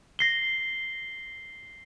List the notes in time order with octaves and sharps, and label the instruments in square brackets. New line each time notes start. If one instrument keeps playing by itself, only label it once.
[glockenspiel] A#6 C7 G7